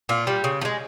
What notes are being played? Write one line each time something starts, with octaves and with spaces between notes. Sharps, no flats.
A#2 F4
G3
C#3
F3
G#3